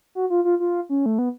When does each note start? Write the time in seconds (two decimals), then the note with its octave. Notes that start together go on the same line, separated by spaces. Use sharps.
0.15 F#4
0.30 F4
0.44 F4
0.60 F4
0.89 C#4
1.06 A3
1.19 B3